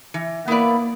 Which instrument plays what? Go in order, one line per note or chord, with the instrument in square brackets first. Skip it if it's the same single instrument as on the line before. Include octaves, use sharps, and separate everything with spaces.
[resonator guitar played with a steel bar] E3
[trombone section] A#3 [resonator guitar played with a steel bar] B3 E4 B4 D5